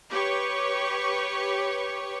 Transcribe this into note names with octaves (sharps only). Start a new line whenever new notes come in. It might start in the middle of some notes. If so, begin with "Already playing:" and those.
G4 B4 C#5 C#6